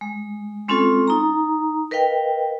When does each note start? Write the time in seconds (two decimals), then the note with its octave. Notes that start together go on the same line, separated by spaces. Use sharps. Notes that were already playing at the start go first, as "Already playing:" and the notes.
0.01 G#3
0.68 G#3 C4 C#4 F4 A4
1.07 D#4 A#5
1.91 A#4 B4 D#5 F5 G5